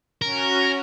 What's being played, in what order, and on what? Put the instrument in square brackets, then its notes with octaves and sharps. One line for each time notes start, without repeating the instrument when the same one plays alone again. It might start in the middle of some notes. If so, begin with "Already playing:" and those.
[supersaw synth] C#4 F#4 [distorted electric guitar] A#4